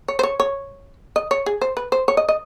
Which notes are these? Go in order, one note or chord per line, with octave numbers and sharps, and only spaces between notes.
C#5
C5
C#5
C#5
D#5
C#5
G#4
C5
B4
C5
C#5
D#5
D#5